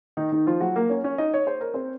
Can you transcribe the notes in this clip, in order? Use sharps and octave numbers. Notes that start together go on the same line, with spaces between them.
D#3 D#4
D#3 D#4
F3 F4
F#3 F#4
A#3 A#4
C#4 C#5
C#4 C#5
D#4 D#5
C#5
C5
A#4
C4 C5